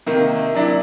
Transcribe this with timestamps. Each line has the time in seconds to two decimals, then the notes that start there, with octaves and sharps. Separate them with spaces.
0.07 C3 D#3 A#3
0.54 F#3 D4 E4